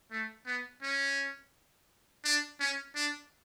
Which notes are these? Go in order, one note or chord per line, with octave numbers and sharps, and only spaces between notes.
A3
B3
C#4
D4
C#4
D4